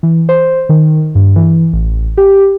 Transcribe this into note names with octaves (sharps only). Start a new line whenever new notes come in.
E3
C5
D#3
G2
E3
A1
G4